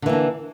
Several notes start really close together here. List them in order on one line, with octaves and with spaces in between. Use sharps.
D3 E3 A#3 D4